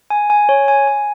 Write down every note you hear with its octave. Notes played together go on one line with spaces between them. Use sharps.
G#5
G#5
C#5
G#5
G#5